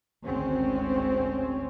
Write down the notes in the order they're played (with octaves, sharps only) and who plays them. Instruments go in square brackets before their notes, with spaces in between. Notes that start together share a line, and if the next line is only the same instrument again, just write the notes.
[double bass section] G#1 D2 G#3 C4 C#4